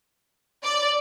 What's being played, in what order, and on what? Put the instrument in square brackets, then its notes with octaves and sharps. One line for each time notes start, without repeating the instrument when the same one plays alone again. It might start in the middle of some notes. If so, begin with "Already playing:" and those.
[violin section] D5